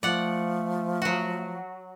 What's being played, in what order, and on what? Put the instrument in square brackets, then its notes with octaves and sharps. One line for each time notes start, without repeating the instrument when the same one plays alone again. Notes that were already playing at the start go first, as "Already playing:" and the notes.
[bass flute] F3 [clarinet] A3 [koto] D5 F#5
[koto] F#3 F#4